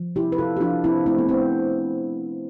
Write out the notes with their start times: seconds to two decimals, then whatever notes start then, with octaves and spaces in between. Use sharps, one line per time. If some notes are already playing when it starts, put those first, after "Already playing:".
Already playing: F3
0.16 C3 E4 G4
0.32 B4
0.38 C3 F4 A4
0.57 G4
0.61 F3 D4 F4
0.84 C3 C4 E4
1.06 A3 C4 E4
1.19 B3
1.29 A3 C4